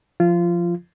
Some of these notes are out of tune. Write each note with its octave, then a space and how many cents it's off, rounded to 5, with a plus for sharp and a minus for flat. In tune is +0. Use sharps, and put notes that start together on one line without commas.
F3 +0 F4 -20